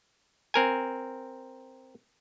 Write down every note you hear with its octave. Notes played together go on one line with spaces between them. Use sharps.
C4 A#4 G#5